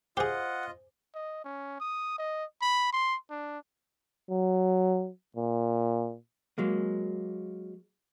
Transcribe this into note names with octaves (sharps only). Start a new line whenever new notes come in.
F4 G4 G#4 C5 D#5 F#5
D#5
C#4
D#6
D#5
B5
C6
D4
F#3
A#2
F#3 G#3 A#3